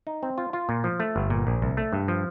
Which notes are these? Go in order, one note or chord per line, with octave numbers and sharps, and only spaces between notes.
D#4
C4
F4
F4
A#2
F3
A3
G1
A#2
A#1
C2
A3
G2
F3